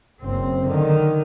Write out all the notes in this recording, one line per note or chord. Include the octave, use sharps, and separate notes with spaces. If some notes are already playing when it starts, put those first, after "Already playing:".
F#1 C4
D3 D#3